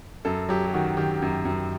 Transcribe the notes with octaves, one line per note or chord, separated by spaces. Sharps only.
F#2 A4
F#3 G4
G4
D#3 F#4
D#3 G4
F#2
F#2